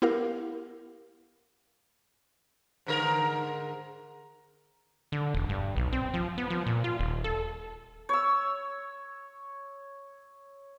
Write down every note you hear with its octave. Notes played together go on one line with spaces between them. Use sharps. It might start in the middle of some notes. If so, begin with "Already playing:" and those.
B3 E4 G4 A#4 F5
G#2 D3 A#4
D3
E1
G2
B1
C4
F3
B3
F3
A#2
F4
D#1
A4
C#5 E6